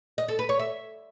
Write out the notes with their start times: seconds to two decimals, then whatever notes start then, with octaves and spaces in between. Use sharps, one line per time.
0.18 D#5
0.28 A4
0.39 B4
0.49 C#5
0.59 E5